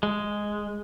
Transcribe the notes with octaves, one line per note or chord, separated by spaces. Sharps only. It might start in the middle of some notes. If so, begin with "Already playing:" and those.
G#3